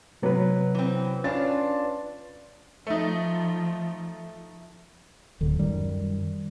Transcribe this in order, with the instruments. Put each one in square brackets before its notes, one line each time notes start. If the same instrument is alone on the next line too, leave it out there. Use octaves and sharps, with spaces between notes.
[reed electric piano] C3 B4 [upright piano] F#3 B3
[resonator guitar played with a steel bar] E3 C4
[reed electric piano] C#4 B4 [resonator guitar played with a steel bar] D4 F4 [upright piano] A6
[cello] F3 [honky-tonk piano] A3 D#4
[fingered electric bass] D1 D3
F#2 D#3 G3